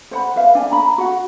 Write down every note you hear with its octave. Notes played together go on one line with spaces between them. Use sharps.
C5 F#5 B5
B4 E5 F5
D4 G#5
A#5 B5
F#4 F#5